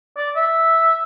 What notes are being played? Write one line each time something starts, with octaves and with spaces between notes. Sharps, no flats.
D5
E5